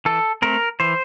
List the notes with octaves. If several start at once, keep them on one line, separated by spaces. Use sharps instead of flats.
E3 A4
A3 C4 A#4
E3 C5